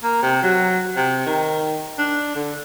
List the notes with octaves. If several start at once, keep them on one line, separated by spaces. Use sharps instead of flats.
A#3
C3
F#3
C3
D#3
D4
D3